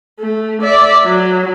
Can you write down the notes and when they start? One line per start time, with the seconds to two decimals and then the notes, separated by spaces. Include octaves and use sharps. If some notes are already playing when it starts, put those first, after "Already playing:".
0.20 A3
0.62 D5 E5
1.05 F#3